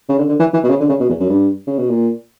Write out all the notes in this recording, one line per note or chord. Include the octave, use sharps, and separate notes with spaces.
C#3
D3
D3
E3
E3
B2
C#3
D3
C#3
B2
E2
F#2
G2
C#3
B2
A#2